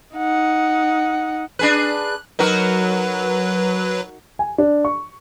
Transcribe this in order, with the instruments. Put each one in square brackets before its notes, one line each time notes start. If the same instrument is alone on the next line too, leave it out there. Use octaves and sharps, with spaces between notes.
[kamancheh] D#4 F#5
[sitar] D4 G#4 B4 [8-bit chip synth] F#6
[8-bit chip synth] F#3 B4 [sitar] D#4 F#4 A#4
[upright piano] G#5
D4
C#6